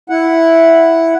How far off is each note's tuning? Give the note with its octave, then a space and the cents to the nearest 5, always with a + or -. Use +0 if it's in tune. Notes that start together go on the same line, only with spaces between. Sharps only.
E4 +0 F#5 +0